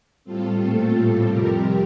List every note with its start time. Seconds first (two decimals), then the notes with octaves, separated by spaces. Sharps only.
0.25 A2 G3 C4 F4 A4
0.59 A#2 A3 C4
0.94 A2 G3 C4
1.28 F2 C3 G3 C4 G4 A#4